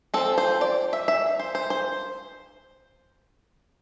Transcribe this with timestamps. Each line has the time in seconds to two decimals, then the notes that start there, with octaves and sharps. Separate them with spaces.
0.14 F3 C4 A4
0.38 C5
0.61 D5
0.93 E5
1.08 E5
1.40 C5
1.55 C5
1.70 C5